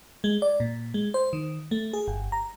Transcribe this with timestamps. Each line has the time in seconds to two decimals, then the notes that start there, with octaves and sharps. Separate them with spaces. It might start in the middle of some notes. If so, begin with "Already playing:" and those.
0.24 G#3
0.42 D5
0.60 A#2
0.94 G#3
1.14 C5
1.33 D#3
1.71 A3
1.93 G#4
2.08 G1
2.32 A#5